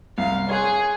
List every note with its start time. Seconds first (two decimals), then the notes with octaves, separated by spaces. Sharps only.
0.18 C2 F5
0.49 G#4 C#5 C6 F#6